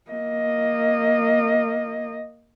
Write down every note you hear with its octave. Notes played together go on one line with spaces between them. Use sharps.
A#3 D#5